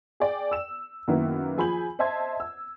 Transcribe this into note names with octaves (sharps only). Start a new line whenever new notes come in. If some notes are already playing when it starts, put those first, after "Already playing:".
G#4 D5 G5
E6 E7
F#2 D#3 A#3 B3 E4
F3 G#4 G#5 B5 G6 F#7
C5 D#5 E5 A5 C6 G#6
E6